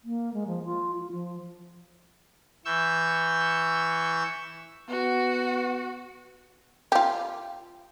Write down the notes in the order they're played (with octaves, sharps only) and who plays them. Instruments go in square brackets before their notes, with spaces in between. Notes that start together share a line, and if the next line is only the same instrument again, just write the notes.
[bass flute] A#3
G#3
F3
F4
F4
F3
[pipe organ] E3 C#6 E6 G6
[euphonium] B3 [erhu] F#4
[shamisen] F4 G4